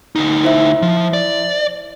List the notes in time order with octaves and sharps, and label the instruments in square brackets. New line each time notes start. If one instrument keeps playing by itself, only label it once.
[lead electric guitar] D2 D#4
[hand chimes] E4 C5 E5
[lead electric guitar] F3
D5